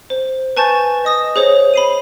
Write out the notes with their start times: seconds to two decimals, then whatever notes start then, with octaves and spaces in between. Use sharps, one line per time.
0.10 C5
0.57 B4 G#5 A5 C#6 G6 A6
1.05 D#5 D#6 A#6
1.36 G#4 C5 C#5
1.74 B5 C7 D#7